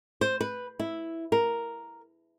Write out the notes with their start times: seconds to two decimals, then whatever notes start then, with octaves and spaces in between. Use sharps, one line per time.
0.21 C5
0.41 B4
0.79 E4
1.32 A#4